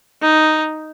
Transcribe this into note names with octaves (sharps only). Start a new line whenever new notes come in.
D#4